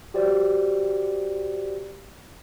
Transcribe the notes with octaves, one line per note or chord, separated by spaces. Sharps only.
F#4 G4 C5 D5